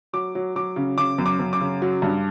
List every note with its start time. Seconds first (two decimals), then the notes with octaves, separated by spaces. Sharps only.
0.13 F#3 D6
0.35 F#3
0.56 F#3 D6
0.76 C#3
0.98 C#3 D6
1.18 F#2
1.26 D6
1.39 F#2
1.53 D6
1.61 C#3
1.82 F#3
2.02 G2